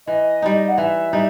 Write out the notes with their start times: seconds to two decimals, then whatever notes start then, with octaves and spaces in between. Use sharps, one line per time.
0.07 E3 D#5
0.42 G3 D#4
0.68 F#5
0.78 E3 E5
1.13 G3 D#4